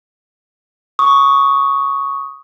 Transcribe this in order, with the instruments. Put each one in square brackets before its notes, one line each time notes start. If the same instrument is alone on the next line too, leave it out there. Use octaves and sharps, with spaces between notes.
[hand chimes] C#6 D#6